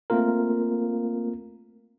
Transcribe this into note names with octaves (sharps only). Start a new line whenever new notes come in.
A3 A#3 C4 F4 A#4